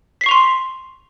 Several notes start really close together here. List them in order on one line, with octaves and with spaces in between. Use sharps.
B6 C7 C#6 F7 C6